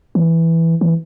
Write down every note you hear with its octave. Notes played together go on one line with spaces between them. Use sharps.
E3
E3